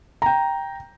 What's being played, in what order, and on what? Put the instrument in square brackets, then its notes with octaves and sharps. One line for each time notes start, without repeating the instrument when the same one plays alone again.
[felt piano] G5 A#5